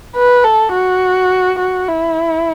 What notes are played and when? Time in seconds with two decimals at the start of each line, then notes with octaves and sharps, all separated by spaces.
0.16 B4
0.44 A4
0.73 F#4
1.59 F#4
1.88 E4